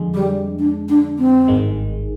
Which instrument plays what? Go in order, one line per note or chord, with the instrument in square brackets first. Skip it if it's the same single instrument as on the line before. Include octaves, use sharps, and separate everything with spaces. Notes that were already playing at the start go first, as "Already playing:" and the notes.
Already playing: [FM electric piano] F2 D3 G#3
[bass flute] G3
D4
D4
C4
[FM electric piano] G#1 G2 D#3 G#3